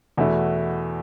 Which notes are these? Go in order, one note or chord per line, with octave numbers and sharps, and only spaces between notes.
E2 B2 A3 E4